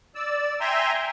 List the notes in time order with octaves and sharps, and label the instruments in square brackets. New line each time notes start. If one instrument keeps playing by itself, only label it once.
[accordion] D5 E6
E5 G5 G#5 A#5 C6